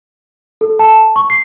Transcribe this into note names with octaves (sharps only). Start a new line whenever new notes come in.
A4
A5
C#6
C7